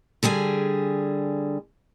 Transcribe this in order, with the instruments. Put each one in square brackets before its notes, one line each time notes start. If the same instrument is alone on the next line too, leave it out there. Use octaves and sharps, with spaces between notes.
[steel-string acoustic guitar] D3 G3 G#4 G#5